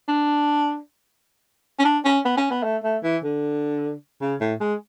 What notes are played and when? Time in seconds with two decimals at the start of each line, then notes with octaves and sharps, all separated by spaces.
0.08 D4
1.79 C#4
1.85 D4
2.05 C#4
2.25 B3
2.37 C#4
2.50 B3
2.63 A3
2.83 A3
3.03 E3
3.23 D3
4.21 C#3
4.40 A2
4.60 G#3